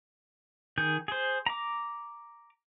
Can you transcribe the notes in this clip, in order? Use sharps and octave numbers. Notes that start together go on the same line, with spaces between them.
D#3 G#4 G6
G#4 C5
A#5 D6